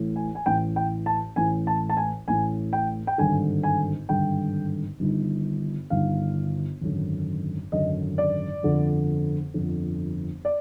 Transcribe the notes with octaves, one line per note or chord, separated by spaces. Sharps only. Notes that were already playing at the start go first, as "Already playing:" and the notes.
Already playing: A1 A2 E3
G#5
G#5
A1 A2 E3 G5
G5
A5
A1 A2 E3 G#5
A5
A5
G#5
A1 A2 E3 G#5
G5
G5
G#1 G2 D3 G#5
G#5
G#1 G2 D3 G5
G1 G2 D#3
G1 G2 D#3 F5
G#1 F#2 D3
G#1 F#2 D3 D#5
D5
G1 F2 D3
G1 F2 D3
D5